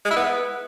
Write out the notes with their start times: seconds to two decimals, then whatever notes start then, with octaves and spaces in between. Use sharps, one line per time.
0.05 G#3
0.11 E4
0.16 B3